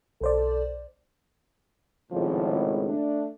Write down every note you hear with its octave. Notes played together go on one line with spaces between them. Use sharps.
B1 A4 C5 D5
G#1 C#2 A2 C3 D#3 F3
A3 D4